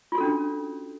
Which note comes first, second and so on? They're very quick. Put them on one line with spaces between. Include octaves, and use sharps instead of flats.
F4 F#4 A4 C#4 D4